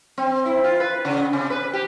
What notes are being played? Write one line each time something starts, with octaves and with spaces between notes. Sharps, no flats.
C4
E4
F4
B4
C#3
C3
B4
G4